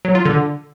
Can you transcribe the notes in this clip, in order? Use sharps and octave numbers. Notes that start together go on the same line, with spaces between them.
F#3
F4
D3